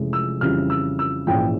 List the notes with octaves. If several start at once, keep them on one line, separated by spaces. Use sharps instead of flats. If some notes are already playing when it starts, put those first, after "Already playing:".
Already playing: F1 F2 E3 G#3 C#4
E6
F2 C#3 E3 G3 F6
E6
E6
A#1 G#2 E3 G#3 C#4 G5